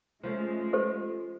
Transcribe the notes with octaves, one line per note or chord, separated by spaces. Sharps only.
F3 G#3 A3 C#4
G4 A4 C5